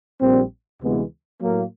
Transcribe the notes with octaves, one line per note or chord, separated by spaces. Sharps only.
A#1 A#2 G3 C4
D2 C3 E3 G#3 B3
A2 F#3 A#3